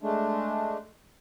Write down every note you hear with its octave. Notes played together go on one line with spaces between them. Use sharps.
G#3 A3 D4